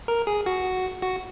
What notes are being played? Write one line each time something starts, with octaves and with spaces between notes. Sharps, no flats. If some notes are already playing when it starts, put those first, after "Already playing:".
A#4
G#4
F#4
F#4